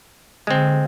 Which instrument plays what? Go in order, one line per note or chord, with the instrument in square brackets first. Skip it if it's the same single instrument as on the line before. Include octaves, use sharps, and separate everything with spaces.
[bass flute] D3 [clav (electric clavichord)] G#3 C4